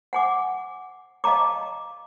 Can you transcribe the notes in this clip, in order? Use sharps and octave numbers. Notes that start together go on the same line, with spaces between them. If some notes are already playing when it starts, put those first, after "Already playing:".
F#5 G#5 D6
D#5 F5 A5 A#5 D6